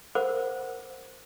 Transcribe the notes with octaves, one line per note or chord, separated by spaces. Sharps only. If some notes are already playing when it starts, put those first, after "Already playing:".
A#4 C5 F#5 D6